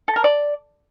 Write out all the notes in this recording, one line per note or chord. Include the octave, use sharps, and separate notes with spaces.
A4
A#4
D5